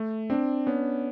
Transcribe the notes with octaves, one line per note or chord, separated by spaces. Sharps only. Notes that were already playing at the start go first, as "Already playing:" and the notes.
Already playing: A3
C4 D4
B3 C#4